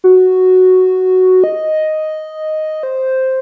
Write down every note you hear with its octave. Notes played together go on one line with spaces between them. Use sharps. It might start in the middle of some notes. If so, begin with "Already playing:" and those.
F#4
D#5
C5